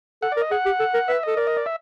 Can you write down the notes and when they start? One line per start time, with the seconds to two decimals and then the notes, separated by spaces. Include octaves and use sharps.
0.22 A4 F#5
0.32 A#4 D5
0.41 D#5
0.51 G#4 F#5
0.66 G4
0.79 A4
0.94 A#4
1.08 B4 E5
1.23 A4 D#5
1.37 A#4 D5
1.47 D#5
1.57 D5
1.66 E5